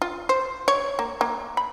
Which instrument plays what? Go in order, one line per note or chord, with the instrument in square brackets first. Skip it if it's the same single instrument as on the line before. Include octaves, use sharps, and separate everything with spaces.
[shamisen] F4
C5
C#5
A#3
A#3
B5